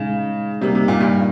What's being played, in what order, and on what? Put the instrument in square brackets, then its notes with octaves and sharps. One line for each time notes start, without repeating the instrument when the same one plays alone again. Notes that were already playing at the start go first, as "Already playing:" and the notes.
Already playing: [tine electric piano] A#2 G#3 D#4 [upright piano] C#3
[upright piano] C3 [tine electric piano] G3 A#3 D#4 G4 A#4
[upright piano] C3
A#2
G2